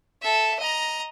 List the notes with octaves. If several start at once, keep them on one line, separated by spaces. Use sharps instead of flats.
A4 E5
D#5 A#5